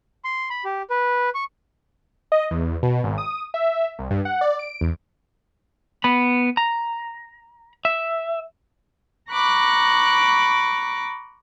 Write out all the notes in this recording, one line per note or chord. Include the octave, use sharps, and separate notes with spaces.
C6
B5
G4
B4
C#6
D#5
E2
B2
G#1
D#6
E5
C2
G2
F#5
D5
D7
E2
B3 B5
A#5
E5
A#5 B5 C#6 D6 F#6